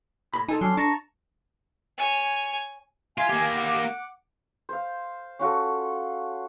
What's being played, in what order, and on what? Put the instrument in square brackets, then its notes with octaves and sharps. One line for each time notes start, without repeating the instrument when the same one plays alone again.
[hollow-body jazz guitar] A2 B5
[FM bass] D#4 [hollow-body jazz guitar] F4 A4 G#5
[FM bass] F#3 [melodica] C#4 D4 C6
[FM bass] D4 [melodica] A5 A#5 C#6
[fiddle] C#5 G#5
[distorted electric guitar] F4 [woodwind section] E5 F5 G#5
[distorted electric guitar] A#3 G4
[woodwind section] F#5 D6
[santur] C5 F5
C#4 F4 F#4 A4